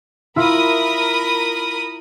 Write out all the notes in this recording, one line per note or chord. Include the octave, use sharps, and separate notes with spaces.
E4 F4 A#4 B5 D#6